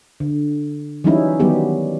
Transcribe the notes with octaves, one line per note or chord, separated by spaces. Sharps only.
D3
E3 F#3 G3 C#4 D#4 E4
D#3 F#3 G3 B3 G4